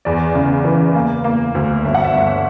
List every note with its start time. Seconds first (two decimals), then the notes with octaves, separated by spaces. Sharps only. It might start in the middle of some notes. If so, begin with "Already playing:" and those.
0.05 E2 D5
0.35 C#3
0.65 E3
0.95 A#3
1.24 A#3
1.55 D2
1.85 G1 E5
1.94 F#5
2.04 E5
2.14 G1